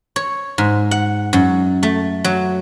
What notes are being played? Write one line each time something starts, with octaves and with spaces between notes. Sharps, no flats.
C#5
G#2
F#5
F#2
A3
F#3